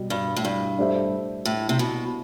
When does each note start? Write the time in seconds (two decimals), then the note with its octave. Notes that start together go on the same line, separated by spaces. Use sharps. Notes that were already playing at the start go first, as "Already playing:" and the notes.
Already playing: B2 G3
0.10 G2
0.36 A2
0.45 G2
0.78 A3 D4 G4 C5 E5
1.45 A2
1.69 C3
1.79 B2